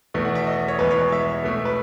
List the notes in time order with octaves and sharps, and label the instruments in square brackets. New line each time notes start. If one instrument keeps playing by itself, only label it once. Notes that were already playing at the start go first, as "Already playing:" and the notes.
[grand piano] E2 B2 A3
F#5
E5
D#5
C#5
E2 B2 G#3 B3 B4
C#5
C#5
E5
B2 A3
B4